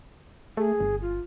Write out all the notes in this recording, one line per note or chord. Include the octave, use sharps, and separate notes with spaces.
A3 G#4
G1
F4